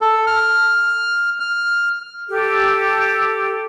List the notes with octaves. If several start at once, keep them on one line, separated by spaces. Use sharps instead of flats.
A4
F6
F6
G4 A4